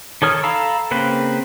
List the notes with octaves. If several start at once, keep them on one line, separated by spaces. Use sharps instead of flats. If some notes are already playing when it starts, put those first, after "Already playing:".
D#3 A4 C#5 D#6 F6
A4 F5 A#5 B5 E6
C#3 A#3 C4 B4